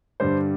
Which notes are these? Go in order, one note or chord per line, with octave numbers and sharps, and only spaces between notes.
G2 D3 G3 C5